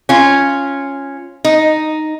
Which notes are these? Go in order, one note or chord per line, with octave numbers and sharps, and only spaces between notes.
C#4 F4
D#4